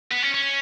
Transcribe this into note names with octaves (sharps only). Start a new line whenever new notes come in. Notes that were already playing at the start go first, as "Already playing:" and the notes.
B3
C#4
C#4